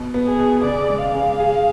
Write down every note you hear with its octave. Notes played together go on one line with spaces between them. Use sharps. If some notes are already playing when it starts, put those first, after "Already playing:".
Already playing: B2
B3
G#4
B2
C#3 D5
G#3
F5
C#3
G#4